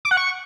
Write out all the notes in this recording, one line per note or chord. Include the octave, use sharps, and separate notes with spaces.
D6
F#5
C#6